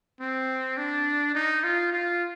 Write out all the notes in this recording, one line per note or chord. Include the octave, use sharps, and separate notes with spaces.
C4
D4
D#4
F4
F4